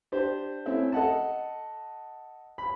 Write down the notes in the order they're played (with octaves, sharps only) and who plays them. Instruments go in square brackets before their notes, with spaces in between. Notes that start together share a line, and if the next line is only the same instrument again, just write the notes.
[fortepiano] D4 G4 C5
A3 C4 C#4 E4
A4 D#5 F#5 A5
B5